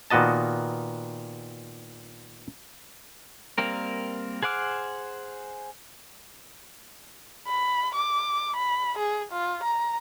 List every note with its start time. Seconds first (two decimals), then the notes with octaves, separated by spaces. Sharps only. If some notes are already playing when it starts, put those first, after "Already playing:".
0.10 A#2 D#3 B3 F#4 D#5 A5
3.57 G3 A#3 C4 A#4
4.43 G#4 C5 F#5 D6 F6
7.47 B5
7.95 D6
8.56 B5
8.98 G#4
9.32 F4
9.63 A#5